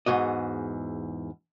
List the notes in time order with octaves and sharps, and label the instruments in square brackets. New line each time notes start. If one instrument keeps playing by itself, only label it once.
[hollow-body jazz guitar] E2 G#2 F#4 D#5